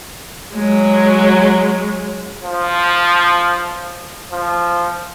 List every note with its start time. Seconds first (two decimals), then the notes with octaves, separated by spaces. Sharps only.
0.53 F#3 G#3
2.43 F3
4.32 F3